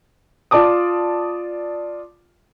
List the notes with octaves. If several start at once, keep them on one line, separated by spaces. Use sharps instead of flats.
F4 D5 A5 D6 D#6